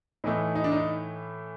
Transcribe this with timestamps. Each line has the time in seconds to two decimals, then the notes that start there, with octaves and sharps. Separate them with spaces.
0.24 A2 E3 A3 D#4
0.55 D#4
0.64 D4
0.72 D#4